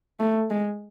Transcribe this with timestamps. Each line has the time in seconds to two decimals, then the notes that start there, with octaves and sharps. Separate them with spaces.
0.20 A3
0.50 G#3